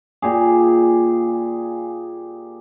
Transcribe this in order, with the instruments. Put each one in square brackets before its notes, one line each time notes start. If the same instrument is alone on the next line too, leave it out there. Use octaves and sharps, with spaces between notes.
[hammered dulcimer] A#2 G4 G#4